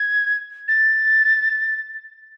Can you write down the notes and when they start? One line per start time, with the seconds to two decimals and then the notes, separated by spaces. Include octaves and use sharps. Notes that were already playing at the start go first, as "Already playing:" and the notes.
Already playing: G#6
0.68 A6